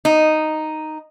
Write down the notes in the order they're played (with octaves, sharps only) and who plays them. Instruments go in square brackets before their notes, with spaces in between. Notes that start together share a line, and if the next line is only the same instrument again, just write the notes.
[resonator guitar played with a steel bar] D#4